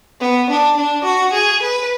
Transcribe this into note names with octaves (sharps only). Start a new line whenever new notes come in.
B3
D4
D4
F#4
G#4
B4